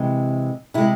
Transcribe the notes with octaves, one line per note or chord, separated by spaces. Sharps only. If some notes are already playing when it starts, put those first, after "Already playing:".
Already playing: C3 E3 G#3
C3 G#3 E4